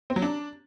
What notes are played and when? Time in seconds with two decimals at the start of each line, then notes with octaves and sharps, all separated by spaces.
0.10 C4
0.16 F#3
0.22 D4